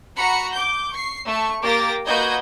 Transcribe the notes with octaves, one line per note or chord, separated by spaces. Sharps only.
F#4 A#5 B5 C#7
D6 G6
C#6 C7
A3 C#6
A#3 G4 D6 A6 A#6
A#3 F#4 B4 D#5 G6 G#6